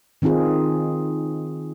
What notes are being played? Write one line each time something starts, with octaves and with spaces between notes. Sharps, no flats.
D#3 C4 D#4 F4 G#4